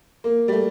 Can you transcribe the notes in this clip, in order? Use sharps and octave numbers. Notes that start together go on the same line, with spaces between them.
A#3
G3
A3